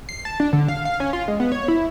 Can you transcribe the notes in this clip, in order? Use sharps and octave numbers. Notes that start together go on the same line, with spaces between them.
C7
A5
D4
D3
F5
F5
C#4
F4
G#3
B3
C#5
E4